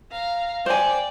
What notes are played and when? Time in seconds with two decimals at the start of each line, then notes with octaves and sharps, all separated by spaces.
0.12 F5 A#5
0.66 C5 D5 G5 G#5